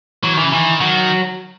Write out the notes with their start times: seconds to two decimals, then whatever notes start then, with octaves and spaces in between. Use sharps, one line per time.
0.23 E3 F#3
0.33 D#3 E3
0.43 C#3
0.52 D#3 E3
0.80 D#3 F#3